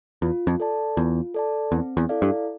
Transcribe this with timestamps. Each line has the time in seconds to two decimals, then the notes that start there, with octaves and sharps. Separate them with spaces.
0.22 E2 F4
0.47 F2
0.60 A4 D5 A5
0.97 E2 F4
1.34 A4 D5 A5
1.72 E2 C4
1.97 E2
2.09 E4 A4 D5 F5
2.22 G2